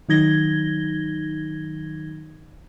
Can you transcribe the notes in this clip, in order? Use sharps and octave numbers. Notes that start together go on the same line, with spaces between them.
D#3 F#3 D#4 G#6 A#6 G7